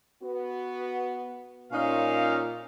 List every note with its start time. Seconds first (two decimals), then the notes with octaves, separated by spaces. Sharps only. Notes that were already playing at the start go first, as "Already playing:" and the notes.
0.23 B3 F#4
1.72 A#2 C#4 D#4 F5